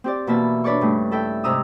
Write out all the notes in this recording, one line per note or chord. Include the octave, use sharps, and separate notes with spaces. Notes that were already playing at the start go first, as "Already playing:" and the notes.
C4 G4 D5
B2 E3 A#3 E5 A5
D4 B4 C#5 D5 C#6
G2 C#3 A3
E4 A4 E5 G5
G#2 C3 A#5 D#6 E6